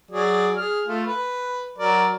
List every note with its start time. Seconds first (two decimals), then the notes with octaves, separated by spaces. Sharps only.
0.11 F#3 G#4 D5
0.57 G#4 F6
0.87 A3 F4
1.06 B4
1.78 F#3 A#4 D5